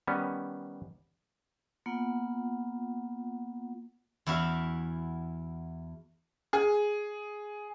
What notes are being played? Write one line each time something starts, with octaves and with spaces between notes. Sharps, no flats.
D#3 G3 B3 C#4
A#3 B3 F4 F#5
E2 E4 F#4 E5 F5
G#4